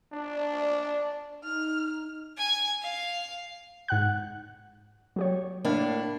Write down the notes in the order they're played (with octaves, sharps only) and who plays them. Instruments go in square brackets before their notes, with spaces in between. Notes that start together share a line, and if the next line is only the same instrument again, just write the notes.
[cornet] D4 [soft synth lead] D5
[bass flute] D#4 [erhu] F6
[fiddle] G#5
F5
[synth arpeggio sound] G#2 F#5 F#6
F#3 G4 C#5
[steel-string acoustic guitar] A2 A#3 D4